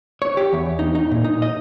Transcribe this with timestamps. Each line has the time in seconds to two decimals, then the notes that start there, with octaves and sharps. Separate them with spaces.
0.22 C#5
0.37 G4
0.53 E2
0.79 D#4
0.95 D#4
1.11 A#2
1.24 D#4
1.42 D#5